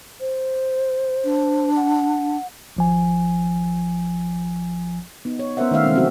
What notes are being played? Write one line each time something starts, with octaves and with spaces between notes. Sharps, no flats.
C5
D4
F#5
G#1 F3 G#5
B3 D#4
C#5
B3 C#4 A#4 C5 E5 F#5
D#3 A3 E5 F5
C3 E3 F#3 G#3 C4 C#4
F3 C4 C#4 F#4 E5 F5